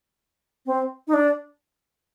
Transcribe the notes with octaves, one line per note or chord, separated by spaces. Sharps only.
C4
D#4
D4